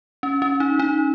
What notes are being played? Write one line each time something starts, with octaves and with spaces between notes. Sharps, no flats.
C#4
C#4
D#4
D#4